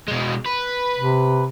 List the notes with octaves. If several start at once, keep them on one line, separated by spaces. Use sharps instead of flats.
B2 G#3
B4
C3